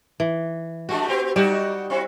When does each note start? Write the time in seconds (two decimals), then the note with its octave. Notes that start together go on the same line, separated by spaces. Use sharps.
0.20 E3
0.89 G3 G#3 D4 F#4
1.08 B3 C4 G4
1.36 G3 D#4 F#4 G4
1.90 C4 E4 F#4